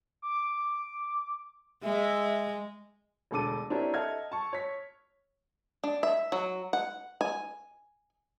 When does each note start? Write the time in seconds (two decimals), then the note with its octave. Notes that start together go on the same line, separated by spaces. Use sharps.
0.22 D6
1.83 G#3 E5
3.31 E1 D2 A4 D6 D#7
3.70 C4 D4 E4 G4 A#4 C#5
3.94 A4 D#5 E5 F#5 F6 G#6
4.32 A5 C#6
4.53 C#5 B6
5.84 D4
6.03 E5
6.32 F#3
6.73 F#5
7.21 G#5